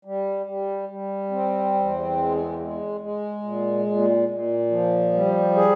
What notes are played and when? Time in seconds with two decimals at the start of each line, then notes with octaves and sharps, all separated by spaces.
0.05 G3
0.46 G3
0.89 G3
1.31 C4
1.74 E2
2.17 G#3
2.59 G#3
3.01 G#3
3.43 A#2
3.86 A#2
4.28 A#2
4.70 F3
5.13 G3
5.55 G#4